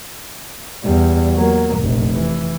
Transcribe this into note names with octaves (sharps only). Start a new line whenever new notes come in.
E2 G3
F#3 A#3
F1 A#1
E3